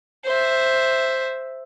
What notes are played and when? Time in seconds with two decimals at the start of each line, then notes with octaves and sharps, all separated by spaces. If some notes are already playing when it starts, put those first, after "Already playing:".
0.25 C5 E5